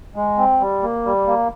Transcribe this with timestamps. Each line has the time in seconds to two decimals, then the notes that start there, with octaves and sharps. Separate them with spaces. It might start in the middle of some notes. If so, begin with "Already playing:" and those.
0.16 G#3
0.38 C4
0.61 G3
0.83 A#3
1.05 G3
1.27 A#3